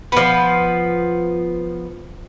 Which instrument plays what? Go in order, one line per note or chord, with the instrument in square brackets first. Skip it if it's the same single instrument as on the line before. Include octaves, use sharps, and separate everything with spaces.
[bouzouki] F3 B3